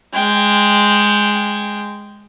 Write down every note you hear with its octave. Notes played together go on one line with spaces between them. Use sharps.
G#3 G5